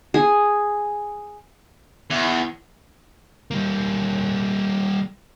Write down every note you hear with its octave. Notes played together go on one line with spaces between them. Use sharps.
G#4
E2
G3 A#3